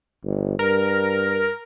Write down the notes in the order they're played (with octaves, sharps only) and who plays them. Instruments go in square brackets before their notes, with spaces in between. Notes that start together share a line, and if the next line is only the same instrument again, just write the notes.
[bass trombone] G1
[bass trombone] G2 [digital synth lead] A#4